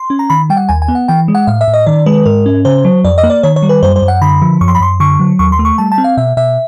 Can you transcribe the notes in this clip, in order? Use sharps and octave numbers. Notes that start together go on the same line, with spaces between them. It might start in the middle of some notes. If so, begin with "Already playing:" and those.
Already playing: C6
C#4
A#5
D#3 B5
G3 G5
F#5
D#2 G#5
G#5
B3
F#5
E3 G5
G#3
F#5
A2 F5
E5
A2
D#5
D#3 D5
G#3 B4
G#2 A#4
C#4
C#3 C5
F#3
F2 D5
D#5
A#3
D5
D#3 C#5
C#5
G3
B4
F#2 C5
C5
F#2
F#5
D3 B5
F3
F#2 C#6
C6
B5
F#2 C6
D3 C#6
F#3
D#2 C#6
C6
A3
C#6
G3 A5
A5
C4
F5
B2 E5
B2 E5